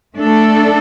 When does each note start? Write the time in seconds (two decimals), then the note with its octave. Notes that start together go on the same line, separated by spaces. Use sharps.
0.18 A3 D4 A4